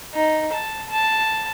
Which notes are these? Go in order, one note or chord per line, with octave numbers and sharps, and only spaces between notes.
D#4
A5
A5